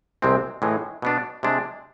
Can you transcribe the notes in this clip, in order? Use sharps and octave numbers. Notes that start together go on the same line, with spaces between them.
C2 C3 E3 G#3 C4
A2 E3 G#3
B2 B3 D4
C3 G#3 D4